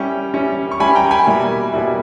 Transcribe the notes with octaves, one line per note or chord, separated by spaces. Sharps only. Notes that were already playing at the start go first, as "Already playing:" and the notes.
Already playing: G3 C#4 E4 G5
G3 C#4 E4
C#6
G3 C#4 E4 G#5 B5
G5 A#5
G#5 B5
B2 G3 A#3 E4
B2 G3 A#3 E4